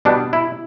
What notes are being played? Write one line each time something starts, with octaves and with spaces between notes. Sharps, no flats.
B2 G3 B3 D4
E4